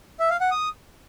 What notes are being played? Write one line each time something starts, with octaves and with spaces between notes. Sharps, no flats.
E5
F5
F#5
D#6